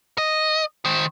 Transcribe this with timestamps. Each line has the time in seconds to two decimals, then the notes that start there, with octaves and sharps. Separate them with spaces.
0.18 D#5
0.85 D#3 C5